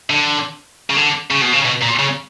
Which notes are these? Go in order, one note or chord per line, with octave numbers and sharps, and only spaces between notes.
D3
C#3
D3
C#3
B2
C#3
B2
A#2
C#3